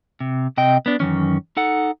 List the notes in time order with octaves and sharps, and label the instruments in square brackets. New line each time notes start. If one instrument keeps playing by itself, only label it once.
[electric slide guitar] C3
C3 D#5 G5
B3 D4
F#2 D#3 E3 C#4
D#4 A4 F#5